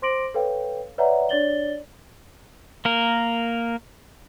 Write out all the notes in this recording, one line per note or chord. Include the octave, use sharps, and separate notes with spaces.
C5 C6 D6 A#6 D7 F#7
A4 B4 C#5 F5 G5
B4 C#5 D5 E5 F#5 A#5
D4 C#5 D5 A6 F#7 G7
A#3 A#4